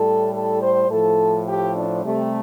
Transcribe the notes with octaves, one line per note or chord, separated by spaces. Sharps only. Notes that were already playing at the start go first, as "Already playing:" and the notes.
Already playing: A2 G3 A4
A4
C5
A2 F3 A4
G4
D4
C3 G3 A3